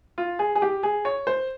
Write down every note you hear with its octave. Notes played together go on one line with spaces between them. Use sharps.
F4
G#4
G#4
G4
G#4
C#5
C5